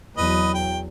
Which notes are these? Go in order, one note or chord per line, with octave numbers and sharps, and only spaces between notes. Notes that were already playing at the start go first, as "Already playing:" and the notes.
E2 F#3 B4 D#5
G5